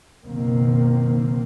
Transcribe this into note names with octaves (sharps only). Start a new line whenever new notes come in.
F#1 B1 B2 D#3 A#3 C4